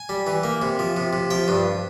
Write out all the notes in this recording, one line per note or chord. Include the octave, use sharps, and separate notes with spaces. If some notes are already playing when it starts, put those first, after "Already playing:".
Already playing: G#5
G3
E3
A#3
C3
F3
C3
C3
F3 G5
G2